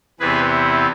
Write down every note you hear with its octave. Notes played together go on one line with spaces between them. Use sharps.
E2 C3 E3 B3 G#4 B4